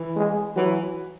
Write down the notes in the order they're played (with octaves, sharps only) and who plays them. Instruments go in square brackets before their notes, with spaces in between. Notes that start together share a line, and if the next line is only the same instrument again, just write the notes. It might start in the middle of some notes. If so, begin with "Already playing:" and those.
Already playing: [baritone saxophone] E3
[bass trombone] G#3
[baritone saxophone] E3 [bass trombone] F#3